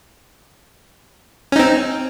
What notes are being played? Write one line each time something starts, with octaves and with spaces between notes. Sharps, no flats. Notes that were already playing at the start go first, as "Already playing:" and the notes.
C4 C#4 D#4